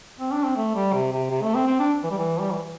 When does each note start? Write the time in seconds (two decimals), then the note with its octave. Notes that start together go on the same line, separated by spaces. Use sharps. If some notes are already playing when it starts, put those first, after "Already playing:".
0.20 C4
0.32 D4
0.45 C4
0.57 A3
0.75 G3
0.93 C3
1.12 C3
1.30 C3
1.42 A3
1.55 C4
1.67 C4
1.79 D4
2.03 E3
2.11 G3
2.18 E3
2.40 G3
2.53 E3